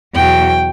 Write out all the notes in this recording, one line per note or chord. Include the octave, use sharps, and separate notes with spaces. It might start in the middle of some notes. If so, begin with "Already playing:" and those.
E2 B2 F#3 G5